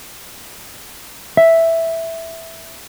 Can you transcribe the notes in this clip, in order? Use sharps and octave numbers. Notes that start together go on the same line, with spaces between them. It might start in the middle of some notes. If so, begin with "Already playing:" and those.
E5